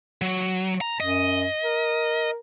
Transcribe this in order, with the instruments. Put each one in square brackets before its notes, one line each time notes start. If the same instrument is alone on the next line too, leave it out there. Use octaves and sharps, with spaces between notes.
[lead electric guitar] F#3
A#5
[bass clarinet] F#2 [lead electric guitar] D#5
[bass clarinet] A#4